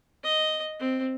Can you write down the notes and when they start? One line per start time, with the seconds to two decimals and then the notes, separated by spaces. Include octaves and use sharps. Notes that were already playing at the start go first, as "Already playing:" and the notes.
0.24 D#5
0.80 C4